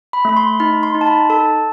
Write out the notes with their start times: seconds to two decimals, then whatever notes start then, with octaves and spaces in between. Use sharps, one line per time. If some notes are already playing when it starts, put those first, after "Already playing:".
0.13 B5
0.25 A3 B5
0.37 C6
0.60 D#4 B5
0.83 C6
0.95 D#4
1.01 A5
1.07 B5
1.30 A4 A5